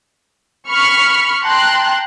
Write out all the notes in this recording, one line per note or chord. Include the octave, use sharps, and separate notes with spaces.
B5 C#6 F6
G5 A5 A#5 C6 F#6